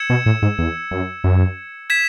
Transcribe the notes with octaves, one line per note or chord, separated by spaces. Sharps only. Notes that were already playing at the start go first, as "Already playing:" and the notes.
Already playing: E6 G#6 C#7 E7
B2
A2
G#2
E2
F#2
F#2
G#6 B6 E7